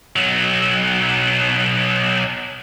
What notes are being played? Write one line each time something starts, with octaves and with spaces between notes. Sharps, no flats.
B1 F#3